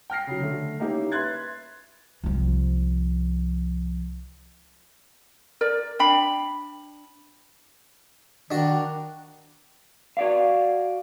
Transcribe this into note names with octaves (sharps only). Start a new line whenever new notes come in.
G5 F6 A#6 C7
C#3 F#3
D3 A3
A#3 C#4 D#4 E4 G4 A#4
B4 E5 C6 F#6 G#6 A6
C2 F3
A#4 D5
D4 G5 B5
D#3 D4 F#4
F#4 D5 F5